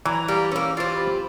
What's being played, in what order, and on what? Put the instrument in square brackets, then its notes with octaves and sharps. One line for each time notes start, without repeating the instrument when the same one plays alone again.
[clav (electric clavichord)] E3 [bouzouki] F#3 [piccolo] A#5
[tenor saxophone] G3 [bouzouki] A#3
[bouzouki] A#3 B3 [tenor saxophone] C#4 [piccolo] E6
[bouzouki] C4 G4 [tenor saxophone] F4 [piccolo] A6
[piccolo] B5